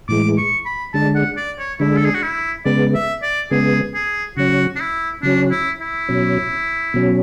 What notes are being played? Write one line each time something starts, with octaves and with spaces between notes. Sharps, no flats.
A2 E3 G#3 D6
C#6
B5
D3 G#3 D4 A5
F#5
D5
C#5
D3 G#3 D4 E4
A4
G#4
F#4
E4
C#3 G#3 B3 D5
E5
D5
C#3 G#3 B3 G#4
G#4
C#3 F#3 C#4 F#4
D4
E4
C#3 F#3 C#4 D4
E4
E4
B2 F#3 C#4
B2 F#3 C#4